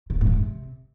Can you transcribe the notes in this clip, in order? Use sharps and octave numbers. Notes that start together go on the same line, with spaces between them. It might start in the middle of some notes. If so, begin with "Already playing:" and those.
B2
A#2
G#2
D3
C3